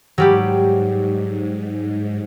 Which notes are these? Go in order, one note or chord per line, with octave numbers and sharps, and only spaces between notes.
G#2 F#3 G3 G4